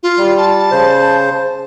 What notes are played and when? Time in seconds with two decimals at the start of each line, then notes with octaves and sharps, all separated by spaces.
0.03 F4
0.18 G3
0.37 A5
0.71 C#3 C5